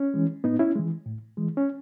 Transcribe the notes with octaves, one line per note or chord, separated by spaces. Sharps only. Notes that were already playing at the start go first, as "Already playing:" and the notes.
Already playing: C#4
E3 G#3
A2 B3 D#4
C#4 E4
E3 G#3
A2
E3 G#3
C#4